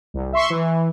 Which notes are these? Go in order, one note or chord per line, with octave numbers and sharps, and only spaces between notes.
C2
E5 C6 C#6
E3